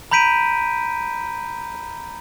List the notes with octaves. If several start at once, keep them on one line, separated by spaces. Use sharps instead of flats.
A#5 B5 G6 B6 D7 D#7